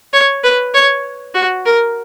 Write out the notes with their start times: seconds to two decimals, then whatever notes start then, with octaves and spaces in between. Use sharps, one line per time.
0.13 C#5
0.44 B4
0.74 C#5
1.35 F#4
1.65 A#4